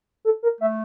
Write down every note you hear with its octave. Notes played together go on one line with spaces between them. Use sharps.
A4
A#4
A3 E5